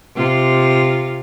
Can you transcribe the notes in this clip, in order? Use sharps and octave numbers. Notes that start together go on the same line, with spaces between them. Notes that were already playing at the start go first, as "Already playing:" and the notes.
C3 F4